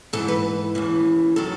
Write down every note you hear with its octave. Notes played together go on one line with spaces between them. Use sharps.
G#2 E3 A4
B4
D#2 C#3 E3
D#3 F#3 A4